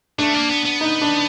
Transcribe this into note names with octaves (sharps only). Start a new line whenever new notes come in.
A3 D4
A#3
B3
B3
D#4
D4